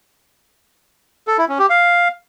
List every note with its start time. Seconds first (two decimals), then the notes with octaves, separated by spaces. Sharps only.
1.28 A4
1.38 E4
1.49 C#4
1.59 G4
1.70 F5